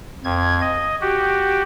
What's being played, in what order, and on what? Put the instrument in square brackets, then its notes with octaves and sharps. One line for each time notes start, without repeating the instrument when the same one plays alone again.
[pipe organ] F2 G#6
D#5
F#4 G4